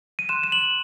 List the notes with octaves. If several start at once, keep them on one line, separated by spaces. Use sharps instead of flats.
D#7
C6 F#6 E7
E7
F#7